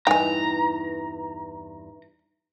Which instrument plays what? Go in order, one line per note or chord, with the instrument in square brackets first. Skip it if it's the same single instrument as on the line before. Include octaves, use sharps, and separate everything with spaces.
[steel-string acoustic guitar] E2 G2 [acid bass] D#4 [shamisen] G5 G#5 [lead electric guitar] A#5